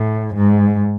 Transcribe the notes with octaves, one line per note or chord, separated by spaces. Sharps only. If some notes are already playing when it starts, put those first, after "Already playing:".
Already playing: A2
G#2